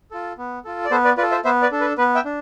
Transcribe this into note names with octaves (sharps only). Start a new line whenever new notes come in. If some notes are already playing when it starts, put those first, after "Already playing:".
F4 A4
B3
F4 A4
D5
B3 A4 C5
B4 D5
F4 B4 D5
A4
C5 E5
B3 C5 E5
B4 D5
D4 A4
B4
B3 B4
E5 G5
D4